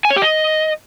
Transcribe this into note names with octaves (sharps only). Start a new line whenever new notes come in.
G#5
C#5
G4
D#5